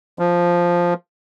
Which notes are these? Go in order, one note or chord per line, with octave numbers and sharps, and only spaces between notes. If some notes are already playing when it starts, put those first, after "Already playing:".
F3